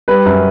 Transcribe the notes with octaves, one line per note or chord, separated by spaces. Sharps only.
G3 B4
F#2